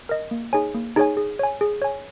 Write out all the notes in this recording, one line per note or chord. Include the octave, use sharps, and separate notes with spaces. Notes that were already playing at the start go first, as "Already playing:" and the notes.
A#4 D#5
A#3
D#4 G#4 C#5 G#5
A#3
D#4 G#4 C#5 G#5
G#4
C#5 G#5
G#4
C#5 G#5